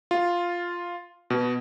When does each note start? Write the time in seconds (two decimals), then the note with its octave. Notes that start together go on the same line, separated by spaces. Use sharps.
0.11 F4
1.30 B2